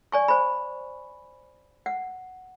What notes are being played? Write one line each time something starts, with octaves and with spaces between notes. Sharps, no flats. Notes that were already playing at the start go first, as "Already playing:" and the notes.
D5 G#5 C#6
C5 B5
F#5